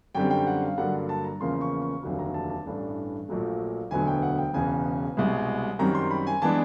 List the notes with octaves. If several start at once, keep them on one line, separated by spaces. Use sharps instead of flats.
F#2 D3 G3 C4 G5
G5
F#5
F5
G2 D3 F#3 A#3 D4 F#5
A5
A#5
E2 C#3 F3 A#3 C6
C#6
C#6
F1 D#2 D3 F#3
A#5
A5
A5
A1 G2 E3 A3 D4
A#1 A#2 F#3 A3
E1 D2 D3 F#3 B3 G#5
G5
F#5
G5
E1 E2 C#3 G#5
C2 B2 G#3
F#2 D#3 G3 C4 A#5
C6
B5
G#5
E3 G#3 B3 D4 A5